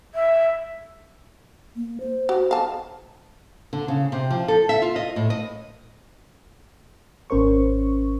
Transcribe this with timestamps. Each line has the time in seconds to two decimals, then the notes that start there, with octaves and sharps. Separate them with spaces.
0.15 E5
1.76 A#3
2.00 C5
2.29 F#4
2.51 F5 A5
3.73 D3
3.88 C#3
4.12 C3
4.30 F3
4.48 A4
4.69 E5
4.82 F4
4.96 D#5
5.16 A2
5.30 D#5
7.30 G#1 C#4 A#4 C5 C#6